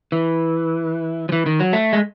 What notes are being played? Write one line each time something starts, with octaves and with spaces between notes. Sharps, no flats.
E3
F3
E3
D#3
F#3
A3
G#3